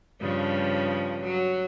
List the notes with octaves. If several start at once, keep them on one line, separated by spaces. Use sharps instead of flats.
G2 C#3 F3
F#3